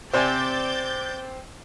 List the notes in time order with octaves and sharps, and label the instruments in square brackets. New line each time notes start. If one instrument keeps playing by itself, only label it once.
[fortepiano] C3 D5 G#5 [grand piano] C4 C5 [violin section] D6 G6 A6